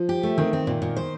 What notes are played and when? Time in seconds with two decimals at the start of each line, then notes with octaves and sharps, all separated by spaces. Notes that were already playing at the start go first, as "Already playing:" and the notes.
Already playing: F3
0.09 G4
0.23 A3
0.38 D#3 C4
0.53 C4
0.67 A#2
0.82 A#2
0.97 C5